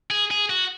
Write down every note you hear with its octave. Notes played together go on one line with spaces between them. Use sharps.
G#4
G#4
F#4